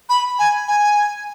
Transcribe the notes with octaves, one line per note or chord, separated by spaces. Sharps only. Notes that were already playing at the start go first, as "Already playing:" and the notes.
B5
G#5
G#5